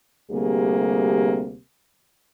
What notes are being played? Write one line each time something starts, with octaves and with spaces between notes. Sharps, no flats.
D2 C3 G3 A#3 G#4